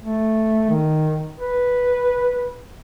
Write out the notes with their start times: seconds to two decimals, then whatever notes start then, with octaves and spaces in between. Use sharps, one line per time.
0.02 A3
0.69 D#3
1.39 B4